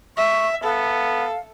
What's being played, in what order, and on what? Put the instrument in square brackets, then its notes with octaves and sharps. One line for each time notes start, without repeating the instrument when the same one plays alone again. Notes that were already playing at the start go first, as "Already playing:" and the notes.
[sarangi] E5 [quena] C#6
[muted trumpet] B3 [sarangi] A4 [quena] F5